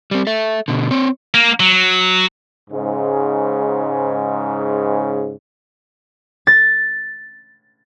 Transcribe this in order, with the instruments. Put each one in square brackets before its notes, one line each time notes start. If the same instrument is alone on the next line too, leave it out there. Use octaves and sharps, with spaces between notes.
[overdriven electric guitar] G3 C4
A4 E5
B2 D3
C4 C#5
[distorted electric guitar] A#3
F#3
[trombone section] G#2 C#3
[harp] A6